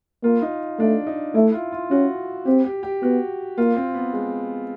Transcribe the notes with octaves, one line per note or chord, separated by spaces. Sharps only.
A#3 F4
D#4
A3 D4
D#4
A3 E4
F4
F4
C#4 F#4
C4 G4
G4
G4
B3 F#4
A#3 F4
C4
B3
G#3